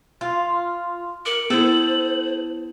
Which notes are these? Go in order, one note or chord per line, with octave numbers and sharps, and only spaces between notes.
F4
A#4 D6 C#7 D7 F#7
B3 E4 A4 C5